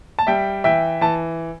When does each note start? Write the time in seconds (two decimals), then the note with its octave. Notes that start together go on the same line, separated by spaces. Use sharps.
0.19 A5
0.27 G3 E5 G5
0.64 E3 E5 G5
1.01 E3 A5